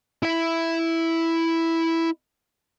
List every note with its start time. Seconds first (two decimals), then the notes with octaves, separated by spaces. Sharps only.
0.23 E4 E5